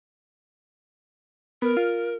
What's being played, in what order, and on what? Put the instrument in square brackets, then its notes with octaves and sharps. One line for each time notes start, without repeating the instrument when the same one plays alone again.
[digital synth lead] B3 [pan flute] A#4
[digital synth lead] F4